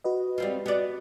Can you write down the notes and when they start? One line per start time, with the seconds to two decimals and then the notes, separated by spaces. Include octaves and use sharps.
0.04 F#4 B4 D#5
0.38 G3 C4 F4
0.66 B3 D5